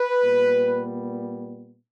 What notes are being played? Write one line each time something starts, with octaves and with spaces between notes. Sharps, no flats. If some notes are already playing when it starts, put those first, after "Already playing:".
Already playing: B4
A#2 G3 B3